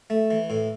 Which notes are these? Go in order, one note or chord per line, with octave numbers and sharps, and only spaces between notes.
A3
E3
A2